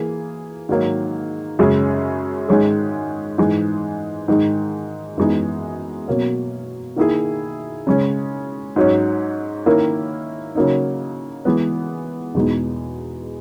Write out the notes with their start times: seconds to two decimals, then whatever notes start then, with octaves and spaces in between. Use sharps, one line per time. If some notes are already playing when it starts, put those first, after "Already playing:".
Already playing: E3 A#3 G#4
0.69 G#2 D#3 F#3 A#3
1.59 F#2 C#3 G#3 C#4 G#4
2.48 G#2 D#3 G#3 C#4 G#4
3.38 G#2 E3 G#3
4.28 G#2 D#3 G#3 D#4
5.17 F#2 E3 G#3 B3 D#4
6.07 B2 F#3 A#3 C#4
6.96 D#3 A#3 E4 G#4
7.87 C#3 G#3 C#4
8.76 G#2 F#3 C#4
9.66 D#3 A#3 C#4 E4 A#4
10.55 C#3 F#3 A#3 D#4
11.45 E3 G#3 B3
12.35 E2 B2 G#3 D#4